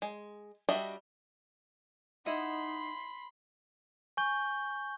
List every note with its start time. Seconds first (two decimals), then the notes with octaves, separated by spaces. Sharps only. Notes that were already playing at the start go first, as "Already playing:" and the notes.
0.02 G#3
0.69 G3 D4 F#4 D#5 E5
2.26 D#4 E4 D#5 F#5 B5 C6
4.17 G#5 C#6 G6 G7